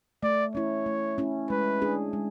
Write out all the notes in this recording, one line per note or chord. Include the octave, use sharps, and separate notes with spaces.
A3 D5
C#4 E4 C#5
A3
C#4 E4
G#3 B4
D4 G#4
G#3